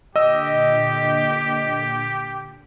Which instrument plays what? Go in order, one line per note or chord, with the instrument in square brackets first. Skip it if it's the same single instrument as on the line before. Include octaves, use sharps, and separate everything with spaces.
[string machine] A#2 D3 [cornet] G4 [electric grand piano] D#5 E6